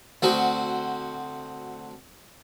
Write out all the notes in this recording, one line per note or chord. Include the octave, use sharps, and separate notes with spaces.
D2 C4 F#4